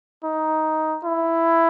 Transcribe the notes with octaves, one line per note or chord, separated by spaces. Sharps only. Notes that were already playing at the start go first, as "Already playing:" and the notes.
D#4
E4